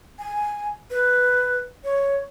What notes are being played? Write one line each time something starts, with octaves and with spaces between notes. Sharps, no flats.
G#5
B4
C#5